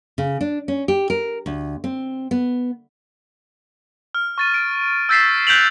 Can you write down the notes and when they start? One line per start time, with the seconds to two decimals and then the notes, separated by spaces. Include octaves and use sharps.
0.18 C#3
0.41 D4
0.68 C#4
0.88 G4
1.10 A#4
1.46 D2
1.84 C4
2.31 B3
4.15 F6
4.38 C#6 A6 D#7
4.54 D7
5.09 E6 G6 A6 B6 C7 E7
5.47 F#6 G6 B6 D7 F7 F#7